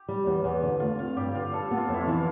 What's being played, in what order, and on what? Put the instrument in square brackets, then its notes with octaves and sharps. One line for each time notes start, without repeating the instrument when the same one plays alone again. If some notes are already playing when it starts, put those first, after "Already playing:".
Already playing: [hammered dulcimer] G4
[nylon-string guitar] G3
E2
E2
D3
[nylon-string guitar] A3 [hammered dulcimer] F4
[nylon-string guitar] C4 [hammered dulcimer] F4
[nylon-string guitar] G2 [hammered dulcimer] G4
[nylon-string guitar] D3 [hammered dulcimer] F4
[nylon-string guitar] G3 [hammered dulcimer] A4
[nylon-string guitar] B3
[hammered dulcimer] F4
[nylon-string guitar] F2
[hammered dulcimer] E4
F4
[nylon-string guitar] E3